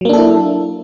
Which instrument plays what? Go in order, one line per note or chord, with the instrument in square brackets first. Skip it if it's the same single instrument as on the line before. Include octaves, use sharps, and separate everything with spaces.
[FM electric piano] F#3
A#3
D4
A4
E4